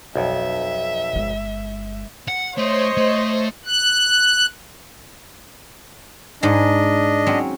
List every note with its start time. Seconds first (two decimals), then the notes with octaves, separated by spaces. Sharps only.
0.16 B1 F2 E5
1.13 G1 G#3
2.28 F#5
2.58 A3 C5 C#5 D#5
2.97 A3
3.65 F#6
6.43 G#2 D4 G#4 D#5
7.26 F#3 C4 C#4